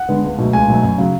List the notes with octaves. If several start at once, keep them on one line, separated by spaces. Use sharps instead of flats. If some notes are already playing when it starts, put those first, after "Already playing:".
Already playing: F#5
D3 G#3 B3
C#2
B2 F#3 A3
C#2 G#5
B2 F#3 A3
F#2
C#3 F#3